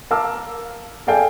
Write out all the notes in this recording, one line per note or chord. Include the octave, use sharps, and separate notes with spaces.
A#4 F5 A5 D6 E6 F6
G#4 A4 D5 F5 G5 G#5